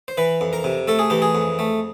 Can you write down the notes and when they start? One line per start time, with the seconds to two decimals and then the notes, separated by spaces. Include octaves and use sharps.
0.08 C5
0.17 E3 B4
0.41 F2
0.53 A#4
0.64 C3
0.88 A3 A4
0.99 G#4
1.10 E3 G4
1.22 G#4
1.35 F2
1.59 A3